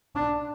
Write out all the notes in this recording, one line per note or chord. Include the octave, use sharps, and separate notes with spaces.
D4